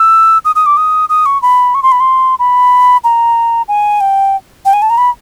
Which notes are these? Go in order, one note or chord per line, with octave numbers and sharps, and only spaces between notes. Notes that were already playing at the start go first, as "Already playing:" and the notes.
Already playing: E6
D#6
D#6
D6
D#6
D#6
C#6
B5
C#6
C6
B5
C6
B5
A#5
G#5
G5
G5
G#5
A5
A#5
B5